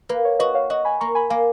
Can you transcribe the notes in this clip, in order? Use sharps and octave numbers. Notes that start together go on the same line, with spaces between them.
A#3 B4
C#5
F#4 B4 D#5
C#5 F5
F#4 D#5 F#5
G#5 B5
A#3 A#5 C#6
G#5 B5
A#3 F5 G#5